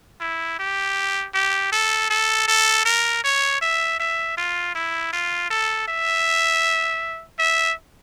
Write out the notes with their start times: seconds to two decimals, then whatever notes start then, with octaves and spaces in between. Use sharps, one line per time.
0.21 E4
0.59 G4
1.34 G4
1.72 A4
2.10 A4
2.48 A4
2.86 A#4
3.24 C#5
3.61 E5
4.00 E5
4.37 F4
4.75 E4
5.13 F4
5.50 A4
5.88 E5
7.39 E5